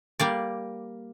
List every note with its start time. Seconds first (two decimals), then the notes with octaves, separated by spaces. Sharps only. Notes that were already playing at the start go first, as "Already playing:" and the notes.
0.20 G3 A#3 D5